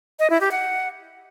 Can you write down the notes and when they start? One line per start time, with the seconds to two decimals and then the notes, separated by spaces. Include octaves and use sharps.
0.19 D#5
0.30 E4
0.41 G4
0.51 F#5